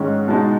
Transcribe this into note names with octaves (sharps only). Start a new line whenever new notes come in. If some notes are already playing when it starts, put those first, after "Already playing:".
Already playing: G#2 D#3 G#3 C#4
B2 G#3 D#4 A5